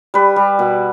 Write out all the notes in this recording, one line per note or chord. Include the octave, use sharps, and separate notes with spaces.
G3 B4
G3
B2